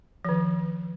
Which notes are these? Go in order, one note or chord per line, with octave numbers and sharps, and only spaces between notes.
D#3 F3